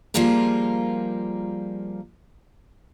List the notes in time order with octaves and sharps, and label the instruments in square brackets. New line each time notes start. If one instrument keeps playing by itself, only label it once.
[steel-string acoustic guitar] F3 G3 A#3 F4 G#4 A#4